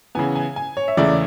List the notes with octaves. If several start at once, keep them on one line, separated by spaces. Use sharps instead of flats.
C#3 E3 B3 G#5
G#5
G#5
C#5
E5
E2 C#3 E3 A3 E4 D5